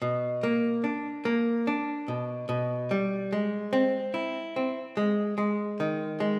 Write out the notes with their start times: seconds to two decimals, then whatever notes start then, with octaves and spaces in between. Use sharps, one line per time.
0.02 B2
0.43 A#3
0.84 D4
1.25 A#3
1.67 D4
2.08 B2
2.49 B2
2.91 G3
3.33 G#3
3.73 C4
4.14 E4
4.56 C4
4.97 G#3
5.38 G#3
5.80 D#3
6.20 G#3